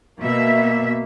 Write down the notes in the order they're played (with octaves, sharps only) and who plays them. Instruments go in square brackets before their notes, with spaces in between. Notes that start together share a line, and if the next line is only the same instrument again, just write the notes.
[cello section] B2 E5 [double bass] A#3